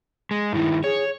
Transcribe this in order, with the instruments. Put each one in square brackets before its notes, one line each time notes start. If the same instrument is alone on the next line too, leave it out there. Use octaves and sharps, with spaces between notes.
[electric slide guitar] G#3
[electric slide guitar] G2 D#3 [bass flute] E4
[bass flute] G#4 [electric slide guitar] C#5